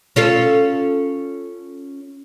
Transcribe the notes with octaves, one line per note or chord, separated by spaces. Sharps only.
C#4 F4 A4